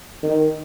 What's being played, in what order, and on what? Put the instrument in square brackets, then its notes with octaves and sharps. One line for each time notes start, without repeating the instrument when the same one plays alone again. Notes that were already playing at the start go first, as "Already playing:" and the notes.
[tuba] D#3